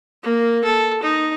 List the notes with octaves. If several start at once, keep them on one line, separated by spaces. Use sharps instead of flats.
A#3
A4
D#4